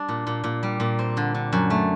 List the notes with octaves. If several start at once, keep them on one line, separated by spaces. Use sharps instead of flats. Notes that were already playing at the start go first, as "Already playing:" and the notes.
Already playing: G3 D4
A#2
A#2
A#2
G3
A#2
C4
D3
D3
F#2
A3